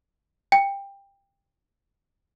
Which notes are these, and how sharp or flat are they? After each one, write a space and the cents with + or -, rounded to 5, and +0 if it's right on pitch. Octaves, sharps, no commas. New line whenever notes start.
G5 +20